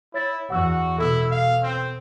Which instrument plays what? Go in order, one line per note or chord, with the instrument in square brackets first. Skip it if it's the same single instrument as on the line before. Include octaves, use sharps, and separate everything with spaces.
[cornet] E4 [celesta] C#5 A6
[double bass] E2 [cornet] F#4 [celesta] F#5 E6
[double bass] B2 [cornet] E4 [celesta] A4 E6
[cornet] F5
C4